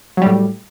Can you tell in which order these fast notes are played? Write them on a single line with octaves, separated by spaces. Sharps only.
F#3 G3 A2